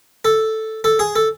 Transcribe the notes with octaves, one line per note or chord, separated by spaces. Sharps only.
A4
A4
G#4
A4